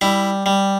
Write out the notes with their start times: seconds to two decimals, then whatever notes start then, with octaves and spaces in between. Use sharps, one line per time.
0.01 G3 E4
0.46 G3